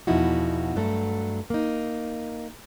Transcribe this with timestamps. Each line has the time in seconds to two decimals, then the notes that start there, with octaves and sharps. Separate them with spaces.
0.07 E2 B2 F3 D#4 E4 F#4
0.76 G2 F#3 A3 A4
1.50 A#3 D#4